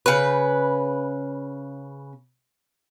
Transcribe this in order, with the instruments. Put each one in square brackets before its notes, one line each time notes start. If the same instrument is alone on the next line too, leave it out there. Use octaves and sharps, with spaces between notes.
[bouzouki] C#3 B4